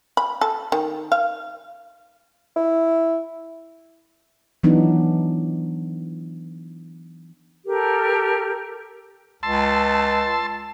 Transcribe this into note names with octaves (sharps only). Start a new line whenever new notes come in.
B5
A4
D#3
F5
E4
E3 F#3 B3 D4 D#4
G4 A4 A#4
C#2 A5 C6 E6